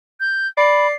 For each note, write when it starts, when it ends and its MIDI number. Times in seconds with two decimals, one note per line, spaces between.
0.20 0.47 91
0.57 0.94 74
0.57 0.87 83
0.57 0.96 96